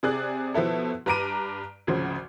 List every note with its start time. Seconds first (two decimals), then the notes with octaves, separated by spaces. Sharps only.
0.03 C3 G#4 D5 F#6
0.54 B2 F3 B3 E4 A4
1.06 G2 B4 A#5 D6 D7 D#7
1.87 G#1 D2 C#3 F3